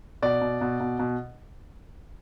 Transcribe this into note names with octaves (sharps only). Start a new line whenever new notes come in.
B2 D5
B2
B2
B2
B2